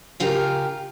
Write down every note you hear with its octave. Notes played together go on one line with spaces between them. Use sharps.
C#3 F4 G4 A#4